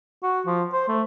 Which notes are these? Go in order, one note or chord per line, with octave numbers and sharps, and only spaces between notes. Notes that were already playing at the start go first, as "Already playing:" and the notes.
F#4
F3
C5
A3